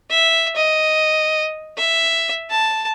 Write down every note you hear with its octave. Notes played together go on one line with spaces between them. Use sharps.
E5
D#5
E5
A5